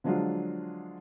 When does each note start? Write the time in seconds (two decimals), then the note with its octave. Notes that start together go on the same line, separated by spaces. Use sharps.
0.04 D3 F3 F#3 G#3 D4 F4